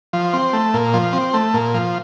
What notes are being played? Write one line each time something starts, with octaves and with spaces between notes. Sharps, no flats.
F3
C4
A3
A#2
F3
C4
A3
A#2
F3